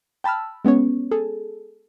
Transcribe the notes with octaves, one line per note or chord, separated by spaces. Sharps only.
G5 A5 B5 E6 F6
G#3 B3 C#4 C#5
G#4 A4